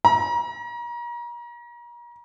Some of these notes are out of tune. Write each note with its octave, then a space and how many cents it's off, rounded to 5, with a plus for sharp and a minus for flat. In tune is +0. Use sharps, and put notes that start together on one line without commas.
A#5 +35